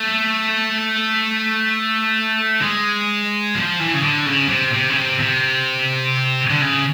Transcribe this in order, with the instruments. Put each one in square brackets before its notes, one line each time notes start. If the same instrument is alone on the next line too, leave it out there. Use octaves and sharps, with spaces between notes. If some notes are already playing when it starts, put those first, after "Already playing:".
Already playing: [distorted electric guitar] A3
G#3
F3
E3
C#3
D3
C#3
C3
C3
C#3
C3
C3
D3
C#3